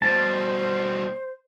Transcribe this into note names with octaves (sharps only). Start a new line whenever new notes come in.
B2 G3 C5 A5